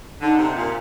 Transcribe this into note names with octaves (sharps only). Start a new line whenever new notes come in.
D3 D#4
C3
A#2